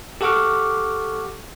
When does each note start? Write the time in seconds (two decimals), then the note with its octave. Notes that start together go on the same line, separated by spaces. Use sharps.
0.21 G4 A4 F#5 C#6 D6 F6